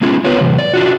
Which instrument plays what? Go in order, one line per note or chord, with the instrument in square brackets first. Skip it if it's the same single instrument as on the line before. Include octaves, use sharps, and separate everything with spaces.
[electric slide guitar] G#3 B3 C#4 E4 F4 G#4
B3 F4 G4 A#4 B4 C#5
A2 C3 E3 F3
D5
D4 F4 F#4